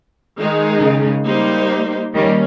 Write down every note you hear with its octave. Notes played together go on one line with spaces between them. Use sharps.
D#3 G#3 D#4 G#4
C#3
G3 A#3 D#4 G4 C5
D#3 G3 A#3 C#4